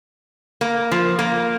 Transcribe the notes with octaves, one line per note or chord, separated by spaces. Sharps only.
A#3
F3
A#3